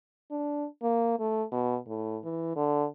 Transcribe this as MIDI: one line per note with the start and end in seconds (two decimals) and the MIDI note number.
0.31 0.65 62
0.83 1.17 58
1.19 1.44 57
1.52 1.77 47
1.87 2.18 45
2.24 2.53 52
2.56 2.86 50